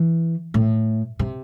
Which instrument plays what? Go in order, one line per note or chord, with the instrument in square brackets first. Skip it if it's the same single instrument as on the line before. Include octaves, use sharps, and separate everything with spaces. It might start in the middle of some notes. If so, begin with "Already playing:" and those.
Already playing: [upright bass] E3
A2
C3